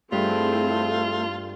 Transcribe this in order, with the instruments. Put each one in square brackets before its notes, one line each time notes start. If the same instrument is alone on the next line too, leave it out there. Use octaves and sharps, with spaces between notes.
[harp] G2 [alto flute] A3 [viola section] C4 E4 G#4 [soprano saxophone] F4